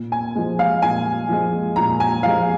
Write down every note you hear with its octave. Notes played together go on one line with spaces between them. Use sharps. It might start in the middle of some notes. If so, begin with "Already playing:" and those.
Already playing: A#2
G#5
F3 G#3
F5
A#2 G#5
F3 G#3
A#2 A#5
G#5
F3 G#3 F5